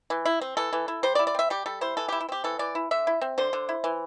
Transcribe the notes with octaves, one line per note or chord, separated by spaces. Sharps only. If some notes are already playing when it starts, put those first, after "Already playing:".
E3
E4
C4
E3 A4
E3
E4
G3 C5
D5
E4
D5
C4 E5
G3 G4
G3 A4
E4 C5
E3 A4
E4 G4
E4
C4 G4
E3 A4
E3 D5
E4
D3 E5
E4
C4
D3 C5
D3
E4
E3